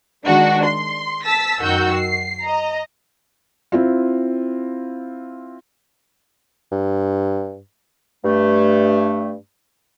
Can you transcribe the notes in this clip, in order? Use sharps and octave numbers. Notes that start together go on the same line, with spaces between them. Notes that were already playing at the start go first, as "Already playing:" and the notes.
D#3 G#3 D4 F#4
C6
A5 E6 A6 B6
F#2 D#3 F#4 E6 G6
C7
D#5 A#5
C4 E4 F4
G2
G2 A3